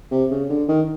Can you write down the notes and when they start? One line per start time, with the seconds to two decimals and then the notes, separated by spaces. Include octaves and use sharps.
0.12 C3
0.31 C#3
0.50 D3
0.68 D#3